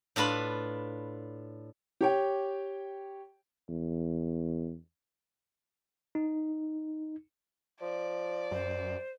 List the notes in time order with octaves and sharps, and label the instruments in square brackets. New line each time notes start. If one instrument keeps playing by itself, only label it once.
[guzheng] A2 D4 F4 B4 B5
[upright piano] G4 C#5 G5
[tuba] E2
[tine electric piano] D#4
[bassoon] F3 [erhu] D5
[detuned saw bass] F#2 [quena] C5